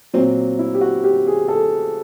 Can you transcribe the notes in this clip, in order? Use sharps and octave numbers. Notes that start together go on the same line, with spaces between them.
A#2 F#3 C4
E4
G4
F#4
G4
G#4
A4